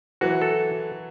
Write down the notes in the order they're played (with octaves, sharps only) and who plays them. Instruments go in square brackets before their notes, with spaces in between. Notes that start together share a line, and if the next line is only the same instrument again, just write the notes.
[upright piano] E3 F#3 [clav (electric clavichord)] F#4
[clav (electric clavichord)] A4